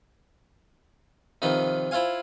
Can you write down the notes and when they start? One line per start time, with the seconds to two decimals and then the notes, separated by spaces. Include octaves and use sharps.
1.42 C3 D#3 F3 D#4 B4
1.91 E4 F4 C5 F5 G#5